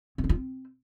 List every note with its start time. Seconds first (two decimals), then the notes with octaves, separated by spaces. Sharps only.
0.18 C4
0.24 C#4
0.29 F4
0.35 C4